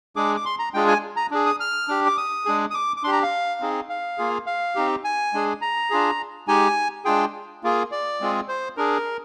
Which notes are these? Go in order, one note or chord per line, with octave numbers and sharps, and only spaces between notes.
G#3 D4 G#4 D6
D6
C6
A#5
G#3 D4 F4 G#4 G5
G#5
A#5
D4 G#4
D#6
F6
D4 G4
D6
D#6
G#3 D4 G#4
D#6
D6
D6
D4 G4 C6
A#5
F5
C4 D#4 G#4
F5
A#3 F4 G#4
F5
C4 D#4 G4
G#5
G#3 D4 G#4
A#5
D4 F4 G#4
G#3 D#4 G4 G#5
G#3 D4 F4 G#4 G5
A#3 F4 G#4
D5
G#3 C4 F4 G#4
C5
D4 G#4 A#4